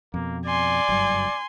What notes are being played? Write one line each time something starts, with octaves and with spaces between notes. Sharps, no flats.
F2 B2 A#3
D5 G#5 C6
F#1 G2 F#3